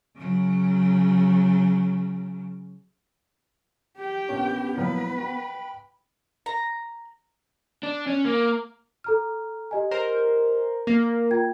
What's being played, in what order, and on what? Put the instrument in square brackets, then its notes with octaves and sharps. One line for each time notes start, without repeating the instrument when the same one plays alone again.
[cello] C#3 F#3
[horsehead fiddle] G4 G5
[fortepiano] A#1 C#5 [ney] B3 [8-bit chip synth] C#4 D4
[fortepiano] A#2 F3 F#3 [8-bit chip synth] G#3 E4 [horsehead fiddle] B4
[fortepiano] F#4 [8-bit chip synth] G5 B5
[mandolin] A#5
[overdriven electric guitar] D4
C#4
A#3
[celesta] A4 A#5 F6
G4 D#5 G#5
[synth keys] A#4 C5
[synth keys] A#3 [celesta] A#6
[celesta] F4 G5 G#6